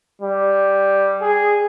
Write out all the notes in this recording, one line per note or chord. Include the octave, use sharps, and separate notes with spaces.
G3
G#4